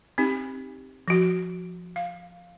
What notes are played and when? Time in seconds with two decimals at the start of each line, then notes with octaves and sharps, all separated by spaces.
0.18 C4 D#4 G4
1.08 F3 F#4
1.96 F5